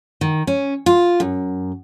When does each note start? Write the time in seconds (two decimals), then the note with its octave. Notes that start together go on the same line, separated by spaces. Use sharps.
0.21 D#3
0.47 C#4
0.86 F4
1.20 F#2